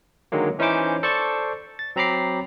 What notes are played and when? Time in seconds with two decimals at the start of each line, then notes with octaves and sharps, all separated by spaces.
0.32 D3 D#3 F#3 G#3 A#3
0.59 E3 C#4 D#4 E4 C5 D6
1.03 A4 C5 D5 A5 C#6
1.79 A6
1.96 F#3 C4 A#5 B5 D6 C7